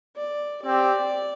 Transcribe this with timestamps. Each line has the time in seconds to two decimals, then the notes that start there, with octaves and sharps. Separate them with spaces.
0.17 D5
0.62 C4 G4 D5